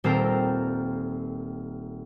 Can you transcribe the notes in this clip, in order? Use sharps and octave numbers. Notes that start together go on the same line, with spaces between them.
D#1 C4 A4 A#4 F5 G5